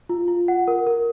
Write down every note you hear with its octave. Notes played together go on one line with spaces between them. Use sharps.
F4
F4
F#5
A#4
A#4